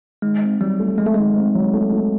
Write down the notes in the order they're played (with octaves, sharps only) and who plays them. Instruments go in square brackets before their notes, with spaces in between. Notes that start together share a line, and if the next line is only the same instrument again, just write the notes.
[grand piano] D#3 [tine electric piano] G#3
[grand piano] C4
[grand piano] F#3 [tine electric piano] G3
[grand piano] A3
[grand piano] F#3 [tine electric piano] G#3
[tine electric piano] A3
[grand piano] D#3 [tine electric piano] G#3
[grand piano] C4
F#3
A3
A3